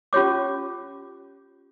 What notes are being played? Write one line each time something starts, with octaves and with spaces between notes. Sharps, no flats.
C#4 F4 G4 C#5 D6